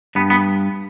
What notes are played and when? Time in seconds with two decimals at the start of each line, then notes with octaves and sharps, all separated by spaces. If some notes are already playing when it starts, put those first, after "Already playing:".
0.15 G2 B3
0.30 B3